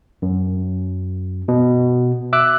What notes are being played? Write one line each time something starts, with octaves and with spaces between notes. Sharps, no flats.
F#2
B2
E5 D6 E6 F#6